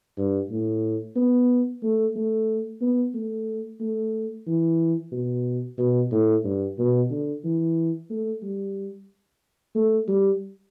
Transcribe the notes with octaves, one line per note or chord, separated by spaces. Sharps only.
G2
A2
B3
A3
A3
B3
A3
A3
E3
B2
B2
A2
G2
B2
D3
E3
A3
G3
A3
G3